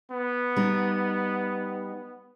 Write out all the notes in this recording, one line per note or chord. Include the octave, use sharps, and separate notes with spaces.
B3
G3 D#4